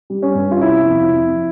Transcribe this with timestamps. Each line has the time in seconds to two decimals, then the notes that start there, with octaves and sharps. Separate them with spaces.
0.10 G3
0.22 C#4
0.35 G2
0.51 F4
0.61 C3 E4
0.86 F2
1.11 F2